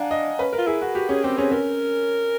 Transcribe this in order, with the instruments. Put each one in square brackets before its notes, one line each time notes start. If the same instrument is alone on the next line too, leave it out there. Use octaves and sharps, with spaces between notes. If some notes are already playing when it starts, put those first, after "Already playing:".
Already playing: [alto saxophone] D4 [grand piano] F5 F#5 G#5 A#5
[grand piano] D#5
[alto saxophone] C#4 [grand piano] B4
[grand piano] A#4
[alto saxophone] F4
[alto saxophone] E4 [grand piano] G#4
[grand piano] F#4
[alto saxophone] F#4 [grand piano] G4
[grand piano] C#4 [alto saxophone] G#4
[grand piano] C4 [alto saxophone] G4
[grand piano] C#4 [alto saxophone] G#4
[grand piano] C#4 [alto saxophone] A#4